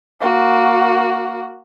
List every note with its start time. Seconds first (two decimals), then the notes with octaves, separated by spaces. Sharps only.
0.21 A#3 F#4